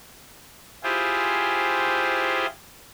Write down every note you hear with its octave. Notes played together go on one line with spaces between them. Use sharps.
E4 F4 G4 G#4 C5